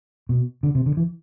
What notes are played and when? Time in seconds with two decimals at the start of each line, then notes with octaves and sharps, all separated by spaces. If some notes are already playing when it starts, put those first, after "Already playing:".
0.29 B2
0.63 D3
0.75 C3
0.86 D3
0.97 E3